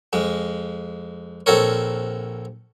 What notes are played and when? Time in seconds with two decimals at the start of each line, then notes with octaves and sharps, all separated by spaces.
0.13 F2 G#3
1.46 A#1 C4 A4 A#4 C#5